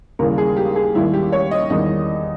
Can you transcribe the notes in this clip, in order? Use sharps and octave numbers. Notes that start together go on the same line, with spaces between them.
D#2 C#3 E3 G3 A#4
G#4
G4
G#4
D#2 D#3 G3 E4
G4
C#5
D#5
E2 D#3 G3 D#5